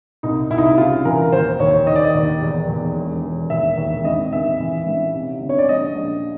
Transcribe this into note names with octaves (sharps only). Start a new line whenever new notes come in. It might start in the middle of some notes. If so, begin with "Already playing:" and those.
C2 D#4
C2 E4
D#4
E4
C#3 F4
E3 A#4
D#2 C5
D#2 C#5
D#3 D#5
D5
D#5
D#2
E2
E2
E1
E1
D#2 E5
D#2
G#1 D#5
G#1 E5
E3
A1
C3
G1
C#5
D5
A#1 D#5
A#1